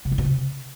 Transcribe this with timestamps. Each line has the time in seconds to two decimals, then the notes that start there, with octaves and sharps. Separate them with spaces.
0.05 C3
0.12 E3
0.18 B2
0.25 C3